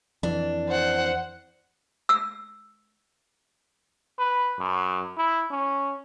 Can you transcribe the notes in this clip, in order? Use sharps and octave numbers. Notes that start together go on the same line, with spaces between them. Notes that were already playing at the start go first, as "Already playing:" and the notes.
F2 E3 D4
C5 F#5
E6
B4
F#2
E4
C#4